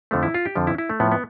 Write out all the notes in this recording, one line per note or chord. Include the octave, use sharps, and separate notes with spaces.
F2 D3 F3 A3
E4
F4
G4
F2 D3 F3
E4
E4
A3
A2 F3 B3
B3